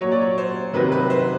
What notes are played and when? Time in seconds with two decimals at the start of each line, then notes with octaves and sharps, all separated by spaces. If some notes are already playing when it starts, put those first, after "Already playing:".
0.01 A#2 F#3 C#5
0.12 D5
0.21 C#5
0.38 C5
0.73 C3 D#3 F#3 B4
0.92 B4
1.10 C5